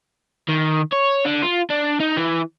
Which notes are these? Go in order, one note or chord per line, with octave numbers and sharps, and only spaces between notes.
D#3
C#5
D3
F4
D4
D#4
E3